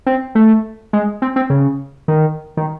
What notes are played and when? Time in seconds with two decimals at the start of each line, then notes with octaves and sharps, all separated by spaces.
0.06 C4
0.35 A3
0.93 G#3
1.22 C4
1.36 C4
1.50 C#3
2.08 D#3
2.57 D#3